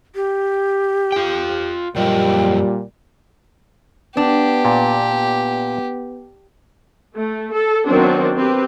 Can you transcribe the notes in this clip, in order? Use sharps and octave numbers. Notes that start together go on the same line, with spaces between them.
G4
F4 G5
F#2 A#2 F3 G3 D#5 G5
B3 D4 G4
A#2
B3
A3
A4
D#3 F#3 B3 C4 D4
C4 G4 B4